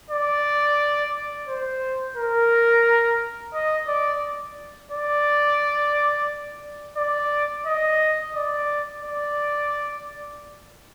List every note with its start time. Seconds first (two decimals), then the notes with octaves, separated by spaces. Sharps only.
0.10 D5
1.48 C5
2.17 A#4
3.54 D#5
3.88 D5
4.92 D5
6.97 D5
7.66 D#5
8.35 D5
9.03 D5